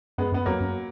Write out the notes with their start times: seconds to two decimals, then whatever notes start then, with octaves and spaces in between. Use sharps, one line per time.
0.18 F#2 G#3 B3
0.32 F#2 B3
0.46 F2 F#3 A#3
0.60 F#2